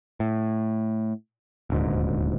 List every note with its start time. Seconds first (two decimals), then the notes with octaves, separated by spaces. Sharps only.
0.20 A2
1.70 D#1 D2 G#2